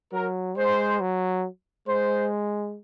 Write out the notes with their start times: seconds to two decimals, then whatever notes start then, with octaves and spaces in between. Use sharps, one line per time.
0.12 F#3 A#4
0.57 G#3 C5
1.01 F#3
1.88 G#3 C5